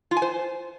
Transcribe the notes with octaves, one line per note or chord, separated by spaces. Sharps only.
F4
G#5
C5